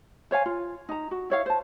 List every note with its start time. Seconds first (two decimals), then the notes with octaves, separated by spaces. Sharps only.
0.31 C5 C#5 F5 G#5
0.46 F4
0.89 D#4 A#5
1.11 F#4
1.30 E4 C#5 F5
1.46 C5 A5